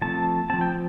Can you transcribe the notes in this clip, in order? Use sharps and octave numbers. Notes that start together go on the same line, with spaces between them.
F3 A3 C4 A5
F3 C4 A5
G5